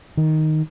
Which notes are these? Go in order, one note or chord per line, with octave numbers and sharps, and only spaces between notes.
D#3